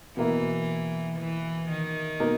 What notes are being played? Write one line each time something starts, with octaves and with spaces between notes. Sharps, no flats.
B2 E3 A#3 E4
E3
D#3
B2 A#3 D#4